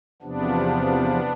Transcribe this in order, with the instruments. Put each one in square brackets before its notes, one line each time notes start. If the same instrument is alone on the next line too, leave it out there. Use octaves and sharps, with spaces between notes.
[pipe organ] E2 C3 F3 B3 D4